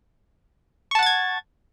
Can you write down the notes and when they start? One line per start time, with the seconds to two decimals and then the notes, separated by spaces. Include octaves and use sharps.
0.91 C#6
0.95 A5
0.99 F#5
1.03 A6
1.06 G#6